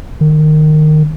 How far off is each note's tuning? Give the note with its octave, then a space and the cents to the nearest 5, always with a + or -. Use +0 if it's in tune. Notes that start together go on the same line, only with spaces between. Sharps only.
D#3 -20